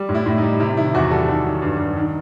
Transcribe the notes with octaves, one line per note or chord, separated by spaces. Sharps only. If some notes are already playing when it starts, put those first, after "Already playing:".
Already playing: G3
A2
E4
A2
D#4
G3
C3 E4
D#3 E4
E2 F#4
G3 A4
D#3
F#3
G2
G2
D#3